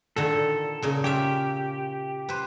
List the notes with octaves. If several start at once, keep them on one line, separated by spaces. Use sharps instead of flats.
A#2 D3 D#3 A4
A#2 C#3 D#4
C#4 F4 G4 E5
B4 C5